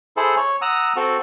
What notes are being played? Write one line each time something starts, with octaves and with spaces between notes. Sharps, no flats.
E4 G#4 A4 C5
C#5
F#5 A#5 D#6 E6
C4 F#4 A4